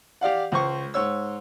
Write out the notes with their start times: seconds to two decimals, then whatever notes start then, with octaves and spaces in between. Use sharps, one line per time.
0.21 G4 D5 F5 F#5
0.52 C#2 C5 C#6
0.94 G#2 C#5 E6